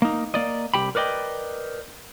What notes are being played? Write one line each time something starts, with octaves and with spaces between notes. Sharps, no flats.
A#3 D#4
A#3 D5 D#5
C2 G4 G5 B5
A#4 B4 D5 D#5 G5